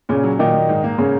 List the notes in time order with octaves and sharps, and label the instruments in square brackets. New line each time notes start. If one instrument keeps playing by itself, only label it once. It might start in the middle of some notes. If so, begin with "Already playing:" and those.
[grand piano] A#2 [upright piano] C#3 C#4
[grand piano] F#3
[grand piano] A#2 [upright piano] D#3 D#4
[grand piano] A#2
G#2
A#3
[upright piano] C#3 C#4